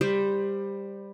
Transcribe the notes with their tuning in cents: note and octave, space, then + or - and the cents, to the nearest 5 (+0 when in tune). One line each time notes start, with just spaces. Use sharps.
G3 +15 C5 +0